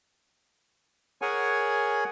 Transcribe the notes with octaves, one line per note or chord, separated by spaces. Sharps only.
G#4 A#4 C#5 F#5 G#5